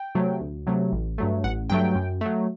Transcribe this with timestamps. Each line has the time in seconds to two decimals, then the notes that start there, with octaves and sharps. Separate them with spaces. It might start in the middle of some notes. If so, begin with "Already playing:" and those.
Already playing: G5
0.15 C3 F#3 A3
0.41 D2
0.67 C3 F#3 A3
0.92 A1
1.18 G2 F#3 A3
1.44 A1 F#5
1.70 G2 F#3 A3 G5
1.95 F#2
2.21 F#3 A3